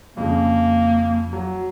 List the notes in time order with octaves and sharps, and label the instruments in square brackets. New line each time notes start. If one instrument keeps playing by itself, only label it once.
[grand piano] F2 C#3 [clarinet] A#3
[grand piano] F#3